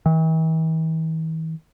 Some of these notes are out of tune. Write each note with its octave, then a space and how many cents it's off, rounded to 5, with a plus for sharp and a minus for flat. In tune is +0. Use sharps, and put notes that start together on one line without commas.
E3 -45